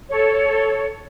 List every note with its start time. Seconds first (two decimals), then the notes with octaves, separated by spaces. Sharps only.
0.10 A4 C#5